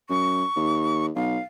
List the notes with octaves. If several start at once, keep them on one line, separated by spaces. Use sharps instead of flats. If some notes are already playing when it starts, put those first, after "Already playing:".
F#2 C#6
D#2
B1 F5